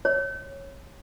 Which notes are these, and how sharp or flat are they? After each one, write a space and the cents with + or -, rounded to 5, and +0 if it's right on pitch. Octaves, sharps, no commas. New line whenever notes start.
C#5 -15